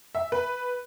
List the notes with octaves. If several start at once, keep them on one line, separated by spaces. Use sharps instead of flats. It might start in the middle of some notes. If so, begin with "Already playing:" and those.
E5
B4